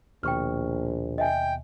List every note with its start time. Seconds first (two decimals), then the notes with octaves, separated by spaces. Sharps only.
0.23 A#1 D#2 B2 G5 C#6 F6
1.18 D#5 E5 G5 G#5